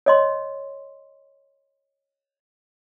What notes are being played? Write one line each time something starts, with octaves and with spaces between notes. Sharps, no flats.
C#5 D#5 C6